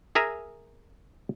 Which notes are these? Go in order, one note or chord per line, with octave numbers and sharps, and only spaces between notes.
G#4 A#4 E5 G#5 A#5